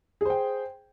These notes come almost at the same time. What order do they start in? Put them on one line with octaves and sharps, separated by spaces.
G#4 C5 G5